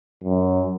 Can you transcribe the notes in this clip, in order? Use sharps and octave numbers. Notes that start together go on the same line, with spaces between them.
F#2